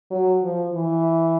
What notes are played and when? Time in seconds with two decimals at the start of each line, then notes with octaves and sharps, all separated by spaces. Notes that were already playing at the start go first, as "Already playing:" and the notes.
0.11 F#3
0.43 F3
0.74 E3